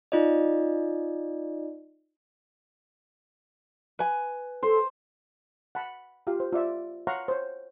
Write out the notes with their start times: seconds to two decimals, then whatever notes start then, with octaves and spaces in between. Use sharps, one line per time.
0.12 D#4 F4 D5 D#5
3.99 B4 G#5
4.63 A4 C5
5.75 F#5 A5 B5
6.27 F4 G4 F5
6.40 C5
6.53 F4 D5 E5
7.07 C#5 F5 F#5 A#5 C6 C#6
7.28 C5 C#5